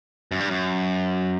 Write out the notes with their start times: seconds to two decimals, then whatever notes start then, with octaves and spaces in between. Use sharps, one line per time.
0.32 F#2
0.40 G2
0.50 F#2